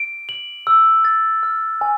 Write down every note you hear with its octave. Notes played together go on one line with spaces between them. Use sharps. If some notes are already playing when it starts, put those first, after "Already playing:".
Already playing: D7
F#7
E6
A6
F6
G#5